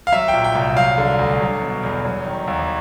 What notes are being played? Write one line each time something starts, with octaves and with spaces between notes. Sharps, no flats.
F5
F#3 E5
G5
A#2
G5
C2
F#3 F5
D3
D2
F#3
B2
E2
F#3
D#3
D#2